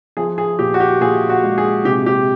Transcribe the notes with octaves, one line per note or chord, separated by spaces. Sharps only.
F3 G#4
G#4
A#2 G4
F#4
G4
A#2 G#4
F#4
G#3
G#4
C3 G4
G4